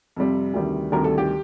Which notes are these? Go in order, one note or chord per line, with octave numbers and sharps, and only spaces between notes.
F2 C3 G3
D2 C3 D#3 G3
D2 C3 D#3 G3 A#4
A4
G4